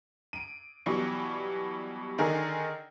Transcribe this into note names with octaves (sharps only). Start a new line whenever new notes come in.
D7 D#7
B2 E3 F#3 G3
D3 D#3 G#4 A#4